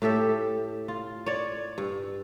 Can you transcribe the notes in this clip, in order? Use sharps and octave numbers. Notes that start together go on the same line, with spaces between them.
A2 G4 A4 E5
F4
C#5 D5
G2